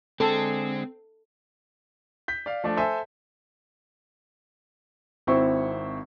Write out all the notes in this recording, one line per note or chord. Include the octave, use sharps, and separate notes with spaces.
D3 G#3 C4 G#4 A4
G6 B6
D5 F5
F3 A3 D4
A4 C5 E5 G#5
G#1 C4 E4 C#6